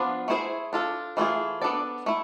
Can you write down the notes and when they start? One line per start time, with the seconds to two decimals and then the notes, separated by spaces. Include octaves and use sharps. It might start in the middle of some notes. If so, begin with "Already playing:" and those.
Already playing: F3 B3 D4 F4 B4
0.28 A3 E4 G#4 C5
0.73 D4 F4 A4
1.17 E3 A3 D4 F4 G#4
1.62 B3 D4 A4 D5
2.06 A3 E4